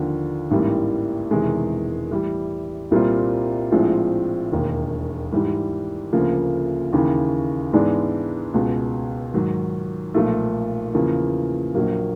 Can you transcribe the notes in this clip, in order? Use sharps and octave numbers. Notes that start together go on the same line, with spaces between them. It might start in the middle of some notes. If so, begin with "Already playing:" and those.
Already playing: D#2 D3 F3
A1 G#2 E3 G3 A#3
E1 E2 C3 D#3 G#3
A2 E3 G3
C2 A#2 G3 C4 F4
A#1 A2 F3 G#3 C4
E1 D#2 D#3
G#2 E3 G3
D2 C#3 F3 A#3
D#2 C#3 E3
G#2 E3 G#3 B3 D4
C#2 B2 G#3
G#2 D#3 F#3
B1 A#2 F3 A3
E2 C#3 F3 A#3
A#1 A#2 F#3 A#3